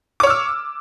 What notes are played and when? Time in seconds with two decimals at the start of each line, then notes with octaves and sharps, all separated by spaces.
0.20 D6
0.23 C#5
0.27 F6
0.30 E6